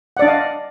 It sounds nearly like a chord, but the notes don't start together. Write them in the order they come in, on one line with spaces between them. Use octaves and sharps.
F#5 D5 D4 D#5 F5